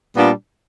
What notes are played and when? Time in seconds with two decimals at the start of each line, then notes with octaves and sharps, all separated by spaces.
0.15 A#2 G3 B3 D4 F4